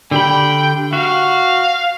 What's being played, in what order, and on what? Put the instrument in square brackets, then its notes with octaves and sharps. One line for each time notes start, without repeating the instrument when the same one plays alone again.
[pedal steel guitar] D3 G4 B5 [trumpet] G5
[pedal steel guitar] F#4 [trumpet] F5